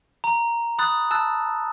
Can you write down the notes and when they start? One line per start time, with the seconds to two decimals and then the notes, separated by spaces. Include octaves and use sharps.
0.24 A#5
0.79 B5 D#6 F#6 A6
1.11 A5 E6 F#6 A6